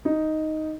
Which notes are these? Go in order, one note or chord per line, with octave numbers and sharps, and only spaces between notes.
D#4